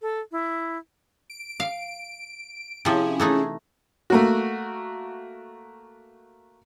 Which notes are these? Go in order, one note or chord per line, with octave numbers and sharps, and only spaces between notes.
A4
E4
D7
F5
C3 F3 C#4 E4 G#4
E3 A3 D#4
A3 A#3 F#4